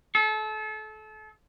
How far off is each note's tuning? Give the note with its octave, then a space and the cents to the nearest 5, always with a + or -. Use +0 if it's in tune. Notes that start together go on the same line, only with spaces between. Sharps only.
A4 -30